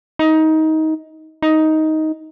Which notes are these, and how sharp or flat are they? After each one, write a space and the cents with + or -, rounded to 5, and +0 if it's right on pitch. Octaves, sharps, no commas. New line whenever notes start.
D#4 +20
D#4 +10